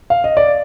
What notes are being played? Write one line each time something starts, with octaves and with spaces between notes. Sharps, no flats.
F5
D#5
D5